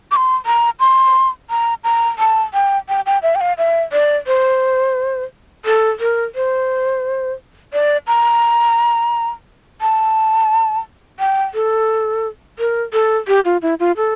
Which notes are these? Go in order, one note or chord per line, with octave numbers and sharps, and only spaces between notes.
D6
C6
A#5
C6
A#5
A#5
A5
G5
G5
G5
E5
G5
F5
E5
D5
C5
A4
A#4
C5
D5
A#5
A5
G5
A4
A#4
A4
G4
F4
E4
F4
A4